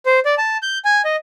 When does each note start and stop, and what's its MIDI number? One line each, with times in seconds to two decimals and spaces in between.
0.06 0.20 72
0.25 0.35 74
0.38 0.57 81
0.62 0.78 91
0.85 1.02 80
1.05 1.16 75